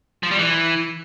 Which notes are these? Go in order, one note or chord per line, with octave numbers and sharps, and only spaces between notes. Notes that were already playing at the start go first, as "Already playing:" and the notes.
F3
G3
E3